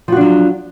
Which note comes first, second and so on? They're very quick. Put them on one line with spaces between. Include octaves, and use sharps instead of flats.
F3 F#4 D4 F#3